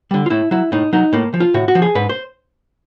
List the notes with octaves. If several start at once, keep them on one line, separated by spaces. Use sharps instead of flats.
D3 G3
F4
A2 E4
F#3 E4
A2 D#4
F#3 D#4
A2 A#3
F3
F4
A2 F#4
F#4
F3
G#4
G#2 B4
C5